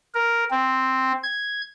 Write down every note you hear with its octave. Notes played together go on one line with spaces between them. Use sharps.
A#4
C4
G#6